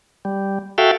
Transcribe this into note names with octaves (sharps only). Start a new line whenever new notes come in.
G3
F#4 A4 E5 F5 G5